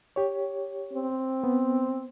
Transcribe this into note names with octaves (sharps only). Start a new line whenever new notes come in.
G4 C#5
C4
B3